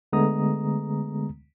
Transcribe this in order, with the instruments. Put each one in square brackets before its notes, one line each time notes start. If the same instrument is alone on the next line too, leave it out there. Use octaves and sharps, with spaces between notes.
[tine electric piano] D3 G#3 A3 B3 A#5 D#6